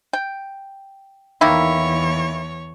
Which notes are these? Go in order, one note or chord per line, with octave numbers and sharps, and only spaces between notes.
G5
E2 D#3 A#3 E4 C#5